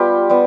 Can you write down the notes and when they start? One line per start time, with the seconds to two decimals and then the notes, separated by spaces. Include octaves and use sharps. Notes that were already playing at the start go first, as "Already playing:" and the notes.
Already playing: G3 B3 F4 G4
0.30 G3 B3